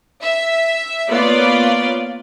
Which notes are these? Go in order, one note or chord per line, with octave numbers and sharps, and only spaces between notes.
E5
A#3 B3 F4 C#5 D5